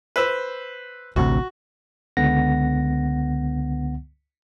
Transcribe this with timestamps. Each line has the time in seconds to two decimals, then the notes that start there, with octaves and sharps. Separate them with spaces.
0.16 B4 C5 E6
1.16 A1 D2 C3 F#4
2.17 C#2 D3 B3 F#5 A#6